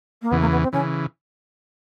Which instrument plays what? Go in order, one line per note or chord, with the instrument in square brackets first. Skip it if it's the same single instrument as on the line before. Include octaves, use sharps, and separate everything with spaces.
[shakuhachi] A#3
[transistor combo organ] E2 C#3 E3 [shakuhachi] B3
[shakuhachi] A#3
B3
C4
[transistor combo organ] C#3 E3 [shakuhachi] C#4